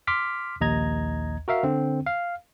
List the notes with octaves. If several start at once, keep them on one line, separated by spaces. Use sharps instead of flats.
C6 D6 F6 B6
A#1 D#2 D#5 A#5 G#6
F#4 A#4 E5 F5
D3 C4
F5